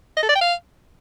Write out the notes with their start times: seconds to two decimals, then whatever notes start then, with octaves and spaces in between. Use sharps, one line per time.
0.17 D#5
0.23 A4
0.29 D5
0.35 G5
0.42 F5